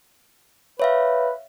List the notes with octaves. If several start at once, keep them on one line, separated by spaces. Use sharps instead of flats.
B4 C#5 E5 F5